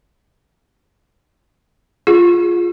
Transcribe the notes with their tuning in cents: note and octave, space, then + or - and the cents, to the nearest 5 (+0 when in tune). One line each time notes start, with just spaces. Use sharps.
F4 +0 G#4 +0